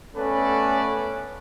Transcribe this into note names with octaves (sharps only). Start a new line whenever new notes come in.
A3 B3 C#4 A4 B4 D5